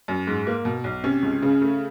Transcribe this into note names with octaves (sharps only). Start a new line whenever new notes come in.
F#2
G#2
A#3
B2
B1
C3 C#4
C#2
C#3
A3